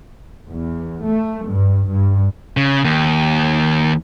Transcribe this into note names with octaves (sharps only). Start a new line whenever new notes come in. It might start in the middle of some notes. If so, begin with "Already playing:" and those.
E2
A3
G2
G2
C#3
D#2